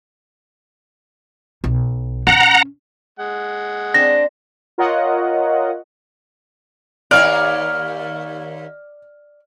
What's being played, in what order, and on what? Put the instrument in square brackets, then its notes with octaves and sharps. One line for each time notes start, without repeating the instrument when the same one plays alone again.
[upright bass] B1
[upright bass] C#4 [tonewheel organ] F#5 A#5
[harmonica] G#3 F#5
[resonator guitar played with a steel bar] C4 D4 [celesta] A#6
[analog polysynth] F4 A#4 C#5 D#5 F#5
[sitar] D#2 A#3 C#5 [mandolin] D5 [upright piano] F6